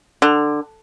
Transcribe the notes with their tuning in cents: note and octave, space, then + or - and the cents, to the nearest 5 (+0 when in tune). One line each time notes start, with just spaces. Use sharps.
D3 +15